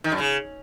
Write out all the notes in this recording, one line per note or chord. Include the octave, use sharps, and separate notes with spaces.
D#3
F#2
C#3